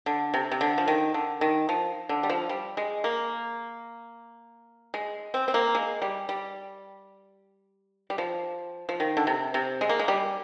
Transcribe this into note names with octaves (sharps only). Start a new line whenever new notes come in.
D3
C3
C3
D3
F3
D#3
D3
D#3
F3
D3
G3
F3
G3
G#3
A#3
G#3
C4
C4
A#3
G#3
G3
G3
G3
F3
F3
D#3
D3
C3
C3
G#3
A#3
G#3
G3